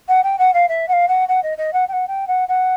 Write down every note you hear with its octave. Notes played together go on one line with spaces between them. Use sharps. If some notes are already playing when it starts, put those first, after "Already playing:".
F#5
G5
F#5
F5
E5
F#5
F5
F#5
F#5
D#5
D#5
F#5
G5
F#5
G5
F#5
F#5